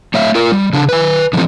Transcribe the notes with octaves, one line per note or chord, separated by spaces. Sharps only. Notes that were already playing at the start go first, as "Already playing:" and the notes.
A3 C#5 E5 F5
F4 A#4
G3
C#3 D4
B4 G#5
D3 E3 F3 A3 C4